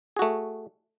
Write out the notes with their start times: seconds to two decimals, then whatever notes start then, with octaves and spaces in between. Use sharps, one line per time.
0.17 G#4
0.19 F#4
0.22 A3